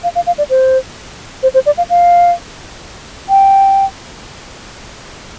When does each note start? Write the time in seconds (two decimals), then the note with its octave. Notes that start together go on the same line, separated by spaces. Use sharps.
0.04 F5
0.15 F5
0.27 F5
0.38 D5
0.50 C5
1.43 C5
1.54 C5
1.66 D5
1.78 F5
1.90 F5
3.29 G5